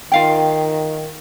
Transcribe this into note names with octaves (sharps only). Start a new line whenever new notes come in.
D#3 F4 F5 G5